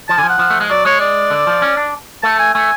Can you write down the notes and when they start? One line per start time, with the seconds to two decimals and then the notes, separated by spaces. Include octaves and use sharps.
0.08 F3 A5
0.18 D3 G#5
0.23 F3
0.29 F#5
0.39 F3
0.50 A3
0.60 G#3
0.70 F#3 D5
0.85 G#3 C#5
1.00 D5
1.31 D3
1.47 F3
1.62 C#4
1.77 D4
2.23 A3 A5
2.39 G#5
2.54 A3 G#5